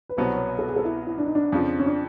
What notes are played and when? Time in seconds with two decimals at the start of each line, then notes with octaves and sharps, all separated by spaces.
0.09 B4
0.17 C2 B2 F#3 B3 C5
0.34 C#5
0.59 A4
0.68 G#4
0.76 A4
0.85 E4
1.07 E4
1.18 D4
1.26 D#4
1.35 D4
1.52 F2 C#3 F3
1.79 C#4
1.86 D4